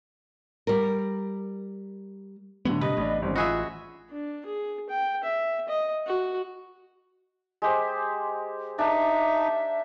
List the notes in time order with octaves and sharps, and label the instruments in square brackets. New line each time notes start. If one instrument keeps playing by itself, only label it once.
[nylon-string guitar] G3 A#4
[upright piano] A2 D3 [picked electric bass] F#3 B3
[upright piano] G2 [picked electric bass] C3 [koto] B4 [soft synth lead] D#5
[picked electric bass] A1 [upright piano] A2 D4
[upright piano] G#1 C#4 [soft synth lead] G3
[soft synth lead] F4 [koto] F#4 G#4 E5 [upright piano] D#5 B5 F#6
[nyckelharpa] D4
G#4
G5
E5
D#5
F#4
[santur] G#3 G4 C5
[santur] D4 A5 [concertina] D#4 [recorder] E5